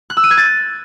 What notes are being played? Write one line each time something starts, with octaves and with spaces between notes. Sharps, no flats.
F#6
E6
D#7
G#6
A6